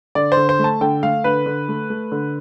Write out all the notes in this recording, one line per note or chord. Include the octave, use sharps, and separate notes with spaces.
D3 D5
C5
D3
C5
A3
A5
D3 G5
A3 F5
D3 B4
D3
A3
A3
D3